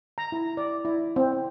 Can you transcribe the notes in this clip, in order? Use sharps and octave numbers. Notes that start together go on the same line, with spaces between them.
A#5
E4
D5
E4
C4